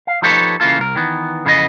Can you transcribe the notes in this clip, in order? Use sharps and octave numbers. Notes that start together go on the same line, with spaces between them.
F5
F3 D#4 G4 A4 B4 C#5
C#3 E3 A#3 F4 A4
C2 A#4
D#3 E3 B3
F2 C#3 E3 B3 A4 D#5